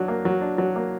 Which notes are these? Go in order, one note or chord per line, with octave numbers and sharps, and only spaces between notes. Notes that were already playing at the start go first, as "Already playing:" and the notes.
Already playing: F#3 D4
A#3
F#3
D4
F#3
A#3